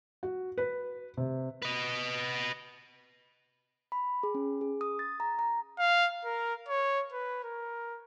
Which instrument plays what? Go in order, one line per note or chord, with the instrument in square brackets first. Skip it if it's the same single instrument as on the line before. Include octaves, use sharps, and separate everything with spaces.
[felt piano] F#4
B4
C3
[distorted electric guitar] B4 D#5
[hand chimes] B5
G#4
C#4
G#4
D#6
A6
A#5
A#5
[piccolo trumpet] F5
A#4
C#5
B4
A#4